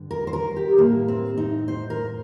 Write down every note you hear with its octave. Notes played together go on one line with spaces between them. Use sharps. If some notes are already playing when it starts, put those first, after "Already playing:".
Already playing: G2 D3
A#4
C5
A#4
G4
A2 A#3
C4
D#4
C5
A#4